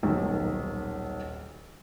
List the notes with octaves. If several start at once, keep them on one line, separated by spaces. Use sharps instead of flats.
D#1 B1 D#3